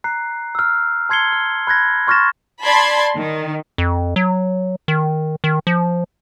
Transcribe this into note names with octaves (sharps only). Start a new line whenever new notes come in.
A#5 F#6 C7
E6 F6
A5 C6 G#6 C7 C#7 G7
F6
B5 F#6 G#6 A#6
C6 C#6 F6 A6 A#6 E7
D5 A5 B5 C6 G#6
D#3
F2
F#3
D#3
D#3
F3